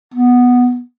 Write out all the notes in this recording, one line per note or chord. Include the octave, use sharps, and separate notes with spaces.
B3